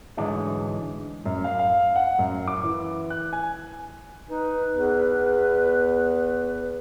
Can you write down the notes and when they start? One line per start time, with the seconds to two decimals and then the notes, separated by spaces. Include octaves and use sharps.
0.17 G#2 D3 E3 F#3 G#3 D4
1.26 F#2
1.44 F5
1.59 F5
1.96 F#5
2.19 F#2
2.48 D6
2.64 E3
3.10 F#6
3.33 G#5
4.29 D#4 B4
4.74 E2